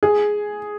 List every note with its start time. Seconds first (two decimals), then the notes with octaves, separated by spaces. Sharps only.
0.03 G#4